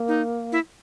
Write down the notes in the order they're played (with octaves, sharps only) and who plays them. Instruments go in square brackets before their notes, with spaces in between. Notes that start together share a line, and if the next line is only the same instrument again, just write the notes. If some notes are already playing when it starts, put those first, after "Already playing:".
Already playing: [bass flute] A#3
[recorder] D#4
E4